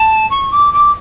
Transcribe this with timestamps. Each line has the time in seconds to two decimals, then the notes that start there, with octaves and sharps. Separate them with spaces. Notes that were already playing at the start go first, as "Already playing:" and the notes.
Already playing: A5
0.30 C#6
0.52 D6
0.74 D6